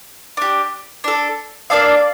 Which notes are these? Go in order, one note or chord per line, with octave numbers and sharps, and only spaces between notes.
D4 G4
D4 A4
A#3 D4 A4 D5 F5